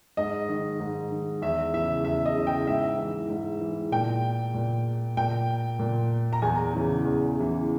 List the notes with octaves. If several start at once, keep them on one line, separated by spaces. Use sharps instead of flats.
G#2 D#5
D#3
G#2
D#3
E2 E5
C#3 E3 E5
E2 E5
D#5
C#3 E3
G5
G#2 E5
E3
G#2
E3
A#2 G5
A#2
A#2 G5
A#2
A#5
E2 G#5
C#3 E3
E2
C#3 E3